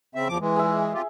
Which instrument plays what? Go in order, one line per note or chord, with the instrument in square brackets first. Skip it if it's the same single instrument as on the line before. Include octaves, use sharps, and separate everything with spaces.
[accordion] C#3 C4 E5
E2 F3 D6
E3 G#3
[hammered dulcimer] G#4 E5
[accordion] C3 F4 G4